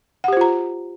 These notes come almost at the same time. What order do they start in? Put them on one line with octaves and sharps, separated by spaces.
F#5 G4 C5 F4 A#5